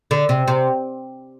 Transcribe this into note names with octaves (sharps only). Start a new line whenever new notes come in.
D3
C3
C3